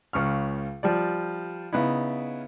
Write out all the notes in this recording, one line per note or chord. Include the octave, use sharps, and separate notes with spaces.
C#2 C#3 C#6 F6
F3 G3 D5
C#3 B3 D#4 E4